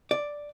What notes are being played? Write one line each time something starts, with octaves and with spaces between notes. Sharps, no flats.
D5